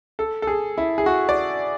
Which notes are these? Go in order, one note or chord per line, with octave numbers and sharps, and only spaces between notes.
A4
A4
G#4
E4
G#4
F#4
D5